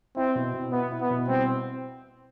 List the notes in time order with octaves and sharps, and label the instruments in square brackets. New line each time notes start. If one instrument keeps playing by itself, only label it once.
[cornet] C4 [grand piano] E4
[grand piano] B2
B2
[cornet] B3 [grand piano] E4
[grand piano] E4
[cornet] B3
[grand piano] B2
[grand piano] G3 [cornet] C4